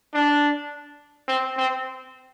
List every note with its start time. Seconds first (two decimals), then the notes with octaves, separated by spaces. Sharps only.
0.14 D4
1.28 C4
1.58 C4